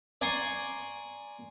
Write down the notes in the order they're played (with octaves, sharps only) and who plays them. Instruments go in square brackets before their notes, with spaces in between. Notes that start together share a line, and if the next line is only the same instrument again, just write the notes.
[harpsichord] D5 G#5 A#5 C6 C#6